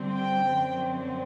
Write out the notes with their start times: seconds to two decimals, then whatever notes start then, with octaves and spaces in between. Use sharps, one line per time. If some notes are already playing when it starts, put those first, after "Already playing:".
Already playing: G2 D3 G3 C4
0.15 G5
0.45 F#2 D3 F#3 C4